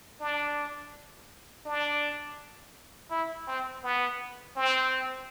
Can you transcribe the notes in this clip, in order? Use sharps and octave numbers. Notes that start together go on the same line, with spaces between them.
D4
D4
E4
C4
B3
C4